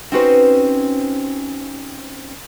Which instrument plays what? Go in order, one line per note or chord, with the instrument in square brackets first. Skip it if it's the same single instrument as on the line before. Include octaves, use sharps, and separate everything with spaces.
[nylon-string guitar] C4 C#4 D#4 F#4 B4 C5